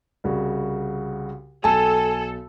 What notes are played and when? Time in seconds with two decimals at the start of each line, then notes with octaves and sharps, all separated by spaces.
0.24 C2 C#3 F#4
1.64 B1 A4 G#5 A5